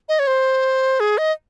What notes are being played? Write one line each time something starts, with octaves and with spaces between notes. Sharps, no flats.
D#5
C#5
C5
G#4
D#5